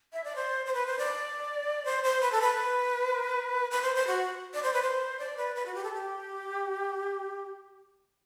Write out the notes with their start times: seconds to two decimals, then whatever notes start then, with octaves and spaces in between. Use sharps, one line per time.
0.13 E5
0.24 D5
0.36 C5
0.66 C5
0.74 B4
0.86 C5
0.98 D5
1.85 C5
2.04 C5
2.21 B4
2.32 A4
2.41 B4
3.71 B4
3.82 C5
3.95 C5
4.07 F#4
4.54 D5
4.63 C5
4.73 B4
4.82 C5
5.19 D5
5.37 B4
5.55 B4
5.66 F#4
5.75 G4
5.84 A4
5.94 G4